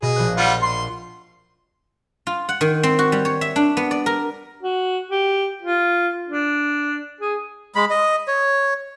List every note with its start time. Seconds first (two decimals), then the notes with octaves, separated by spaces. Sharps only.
0.02 B2 G#4 D#5 F6
0.16 A#1 C5 F#6
0.37 G3 F4 F#5 C7
0.62 C6
2.27 F4
2.49 F#5
2.61 D#3
2.83 C4
2.99 F#4
3.12 G3
3.25 C#5
3.41 E5
3.56 D4
3.77 B3
3.91 D5
4.06 A#4
4.63 F#4
5.11 G4
5.62 F4
6.28 D4
7.21 G#4
7.75 G#3 B5
7.90 D#5
8.28 C#5